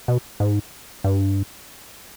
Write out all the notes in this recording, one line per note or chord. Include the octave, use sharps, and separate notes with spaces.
B2
G#2
G2